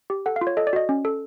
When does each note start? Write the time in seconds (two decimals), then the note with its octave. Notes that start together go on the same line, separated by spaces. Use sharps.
0.10 G4
0.26 A4 F#5
0.36 F5
0.41 F4
0.47 C#5
0.57 A4 D#5
0.67 D5
0.73 F#4 D#5
0.89 C#4
1.05 A4